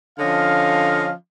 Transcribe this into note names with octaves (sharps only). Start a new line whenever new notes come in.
D3 F3 C#4 D#5 F5